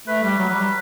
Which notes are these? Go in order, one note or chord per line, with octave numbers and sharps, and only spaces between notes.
A3 B4
G3
F#3
F#3
G3